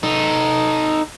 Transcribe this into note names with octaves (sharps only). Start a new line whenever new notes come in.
D#4 A4